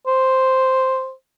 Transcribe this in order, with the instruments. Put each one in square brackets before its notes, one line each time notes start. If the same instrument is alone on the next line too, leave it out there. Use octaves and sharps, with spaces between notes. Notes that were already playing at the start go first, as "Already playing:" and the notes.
[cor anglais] C5